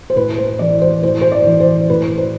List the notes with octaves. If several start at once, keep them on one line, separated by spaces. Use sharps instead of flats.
C5
A2 B4
C5
E3 D5
C5
A2 C5
C5
D5
E3
C5
A2 B4
C5